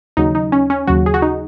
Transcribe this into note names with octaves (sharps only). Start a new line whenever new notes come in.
D#2 C#3 F#3 D#4
D#4
C#4
C#4
D#2 C#3 F#3 F#4
G#4
F#4
D#4